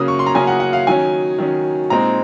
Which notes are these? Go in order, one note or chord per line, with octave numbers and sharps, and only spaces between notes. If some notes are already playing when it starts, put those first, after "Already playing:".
Already playing: C#3 F#3 A#3 C#4 D#6
C#6
C6
A#5
C#3 F#3 A#3 C#4 G#5
F#5
F#5
F5
D#3 F#3 C#4 G#5
D#3 F#3 C#4
A#2 G#3 C4 D#4 A#5